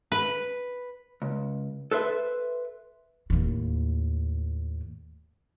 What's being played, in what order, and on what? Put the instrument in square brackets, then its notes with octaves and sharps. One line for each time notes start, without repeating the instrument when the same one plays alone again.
[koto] B4
[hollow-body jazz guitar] C#2
A4 B4 C5 E5
[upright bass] D#2 A2